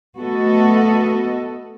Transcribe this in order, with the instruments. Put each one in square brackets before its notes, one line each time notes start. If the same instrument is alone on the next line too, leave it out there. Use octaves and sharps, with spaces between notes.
[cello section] A3 B3 F#4 A4 D#5